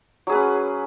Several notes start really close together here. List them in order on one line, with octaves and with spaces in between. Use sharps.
F#3 G#4 B4 C#4